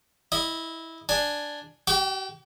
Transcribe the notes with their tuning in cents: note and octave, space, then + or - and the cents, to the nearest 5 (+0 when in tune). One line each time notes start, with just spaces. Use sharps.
E4 -15 D#5 +0
D4 +0 G#5 +0
G4 -45 G5 +0 D6 -45